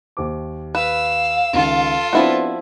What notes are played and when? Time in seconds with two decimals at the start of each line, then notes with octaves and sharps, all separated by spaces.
0.17 D#2 C5 D6
0.75 B4 F5 E6
1.53 C#2 D#3 F4 A4
2.13 F3 B3 C4 D4 E4 F#4